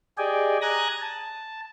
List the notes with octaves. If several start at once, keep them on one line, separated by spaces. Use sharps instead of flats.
G4 G#4 D5 D#5 G5 G#5
G#5 A#5 D#6 F#6 G#6 A#6
A5